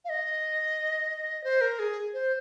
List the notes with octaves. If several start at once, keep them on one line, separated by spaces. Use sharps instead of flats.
F5
D#5
C5
A#4
G#4
C5